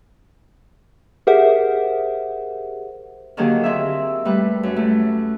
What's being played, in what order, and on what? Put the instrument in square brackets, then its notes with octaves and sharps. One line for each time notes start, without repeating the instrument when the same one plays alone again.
[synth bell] G4 G#4 A#4 C5 E5 F#5
[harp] D3 D#3 F#3 A#3 G4 G#4
C4 G#4 E5
G3 A3 B4
F#2
A3